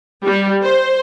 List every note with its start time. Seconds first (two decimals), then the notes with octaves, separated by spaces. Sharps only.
0.25 G3
0.63 C5